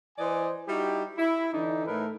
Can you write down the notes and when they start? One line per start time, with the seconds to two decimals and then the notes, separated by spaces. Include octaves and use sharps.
0.18 E3 C5 D5 D#5 G#5
0.68 G3 D#4 E4 F#4 G4
1.18 E4
1.53 D3 E3 D4 D#4
1.86 A2 A3 D#4 A#4 B4